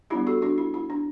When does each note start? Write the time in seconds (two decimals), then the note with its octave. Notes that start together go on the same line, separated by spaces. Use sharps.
0.10 G3 B3 D4 E4 G4
0.27 F#4 A4
0.42 D4 F#4
0.58 E4
0.74 E4
0.90 D4